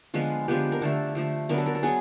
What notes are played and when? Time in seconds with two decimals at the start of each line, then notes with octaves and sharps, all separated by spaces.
0.14 D3 F3 G#3 B3 F4
0.48 D3 F3 G#3 B3 G4
0.72 A#4
0.82 D3 F3 A3 A4
1.15 D3 F3 A3
1.49 D3 F#3 B3 A#4
1.58 A4
1.66 A#4
1.75 A4
1.83 F#3 B3 G#4